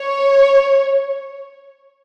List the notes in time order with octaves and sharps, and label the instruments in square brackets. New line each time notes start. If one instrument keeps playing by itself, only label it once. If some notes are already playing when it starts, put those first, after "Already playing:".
Already playing: [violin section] C#5